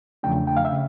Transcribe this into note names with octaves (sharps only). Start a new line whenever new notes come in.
E2 C#3 F3 A3 D4 G5
G5
F5
E5
C#3